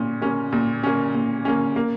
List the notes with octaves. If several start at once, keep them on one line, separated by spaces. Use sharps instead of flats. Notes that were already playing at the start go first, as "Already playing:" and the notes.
Already playing: A#2 C#4
A#3 C#4
A#2
A#3 C#4
A#2
A#3 C#4
A#3